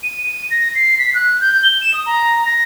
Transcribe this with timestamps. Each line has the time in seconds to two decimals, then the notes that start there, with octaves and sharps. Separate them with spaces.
0.03 D#7
0.24 D#7
0.51 A#6
0.75 C7
0.99 B6
1.14 F#6
1.41 G6
1.63 G7
1.81 E7
1.94 D#6
2.06 A#5
2.46 A#6